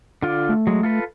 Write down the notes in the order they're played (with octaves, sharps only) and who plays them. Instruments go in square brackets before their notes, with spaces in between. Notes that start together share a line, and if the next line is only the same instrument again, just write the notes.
[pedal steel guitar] D3 F4 D5
[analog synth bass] A3
[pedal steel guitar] F#3 G#3
F4 A4 B4